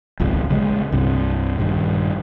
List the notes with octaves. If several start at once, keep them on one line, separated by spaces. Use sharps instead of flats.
D#1 G#1 C#2 F3
A#1 C#3 F#3 G#3
C2 G2
A#1 G2 D#3